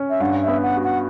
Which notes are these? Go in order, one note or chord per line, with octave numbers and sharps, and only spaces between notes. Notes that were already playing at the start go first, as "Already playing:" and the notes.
Already playing: C#4
E5
G2 F#5
E5
B3
F#5
F#4
F#5